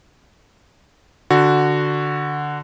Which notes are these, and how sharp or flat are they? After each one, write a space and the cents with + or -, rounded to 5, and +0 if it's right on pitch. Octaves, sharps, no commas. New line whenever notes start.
D3 +0 F#4 -5